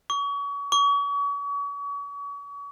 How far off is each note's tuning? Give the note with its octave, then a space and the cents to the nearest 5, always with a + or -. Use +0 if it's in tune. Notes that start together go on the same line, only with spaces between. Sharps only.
C#6 +35
C#6 +40